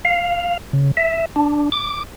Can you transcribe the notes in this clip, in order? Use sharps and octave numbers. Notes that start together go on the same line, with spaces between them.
F5
C#3
E5
D4
D6